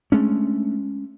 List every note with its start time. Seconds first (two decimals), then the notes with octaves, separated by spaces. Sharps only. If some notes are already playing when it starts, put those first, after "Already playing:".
0.12 G#3 A3 C#4 D4